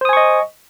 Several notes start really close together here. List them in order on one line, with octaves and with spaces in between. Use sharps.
C5 D#6 G#5 C#6 D#5